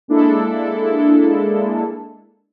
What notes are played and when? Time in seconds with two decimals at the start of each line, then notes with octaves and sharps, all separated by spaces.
0.08 G#3 A#3 D4 E4 A4